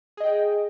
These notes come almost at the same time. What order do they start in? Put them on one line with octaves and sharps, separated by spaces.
G#4 D#5 G5